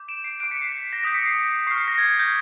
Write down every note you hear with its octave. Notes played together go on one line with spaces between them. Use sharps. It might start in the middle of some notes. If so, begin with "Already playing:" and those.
Already playing: D6 G6
D7 E7
C7 D7
D6 F#6 C7 D7
B6 C#7
C7
B6
A#6
D#6 G6 B6
B6 C#7
C7
C#6 F6 C7
C7
A#6
G#6
G#6
G6